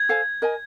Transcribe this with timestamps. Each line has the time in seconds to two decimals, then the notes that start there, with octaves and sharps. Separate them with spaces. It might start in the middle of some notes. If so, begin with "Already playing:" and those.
Already playing: G#6
0.09 A4 C5 F5 G#5
0.42 A#4 D#5 G#5